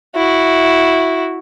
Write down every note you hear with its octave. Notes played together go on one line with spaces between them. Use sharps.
E4 F#4